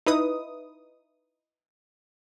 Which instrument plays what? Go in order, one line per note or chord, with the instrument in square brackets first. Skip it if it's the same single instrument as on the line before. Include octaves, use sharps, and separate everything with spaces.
[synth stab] D#4 E4 B4 D#6